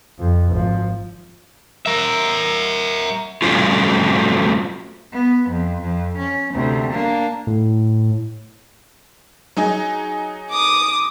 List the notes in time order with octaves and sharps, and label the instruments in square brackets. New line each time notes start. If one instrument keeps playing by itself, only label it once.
[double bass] F2
G#1 F3
[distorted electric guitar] A#4 E5
[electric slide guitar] F#3 G3 A3 C4 C#4 F4
[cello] B3
F2
F2
C#4
D2 C3
A#3 D4
[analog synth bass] A2
[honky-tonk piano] F#3 D#4 G#4
[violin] D6 D#6